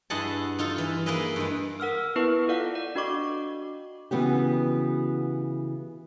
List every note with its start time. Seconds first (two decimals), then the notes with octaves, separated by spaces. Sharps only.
0.10 G2 E4 G#4 D#5 F#5 A5
0.59 D#4 F4 A4
0.78 E3
1.06 A#3 E4 G#4 B4 D#5
1.36 G2 G#3
1.80 A#4 F#5 E6 F6
2.16 B3 E4 B4 C#6
2.48 F4 A4 D5 F5 F#5
2.75 D5
2.95 D4 F#4 D#5 C#6 D6
4.11 C#3 E3 B3 F#4 G4